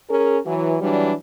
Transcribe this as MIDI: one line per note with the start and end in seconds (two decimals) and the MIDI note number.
0.10 0.38 61
0.10 0.38 68
0.10 0.38 70
0.46 0.76 52
0.46 0.76 54
0.81 1.13 52
0.81 1.13 54
0.81 1.13 55
0.81 1.13 62